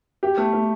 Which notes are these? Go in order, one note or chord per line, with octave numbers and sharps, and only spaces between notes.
G4
A3
A3